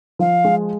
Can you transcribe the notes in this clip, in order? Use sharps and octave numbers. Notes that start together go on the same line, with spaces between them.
F3 F5
G#3